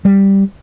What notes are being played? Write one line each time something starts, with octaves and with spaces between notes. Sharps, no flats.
G3